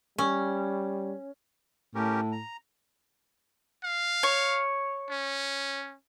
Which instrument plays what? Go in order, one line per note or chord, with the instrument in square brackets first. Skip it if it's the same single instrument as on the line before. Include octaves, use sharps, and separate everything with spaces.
[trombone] G3 [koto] C#4
[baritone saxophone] A2 [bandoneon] C#4 G4 A#4
[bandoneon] A#5
[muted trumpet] F5
[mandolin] C#5
[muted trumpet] C#4